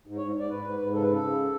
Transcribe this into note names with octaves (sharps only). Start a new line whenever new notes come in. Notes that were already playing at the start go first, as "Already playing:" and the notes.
G#2
G#2 C#5
G#2 D5
G#2 B4
G#2
G#2
C#3 A4
B4
C#3 A4
C#3